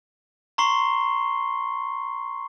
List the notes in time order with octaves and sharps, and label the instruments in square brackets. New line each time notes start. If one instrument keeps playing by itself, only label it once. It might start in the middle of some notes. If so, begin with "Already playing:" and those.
[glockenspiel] A#5 C6 C#6 C7 G7